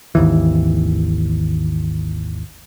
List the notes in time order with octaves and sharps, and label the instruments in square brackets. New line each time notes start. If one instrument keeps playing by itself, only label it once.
[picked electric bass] G#1 D#2 E3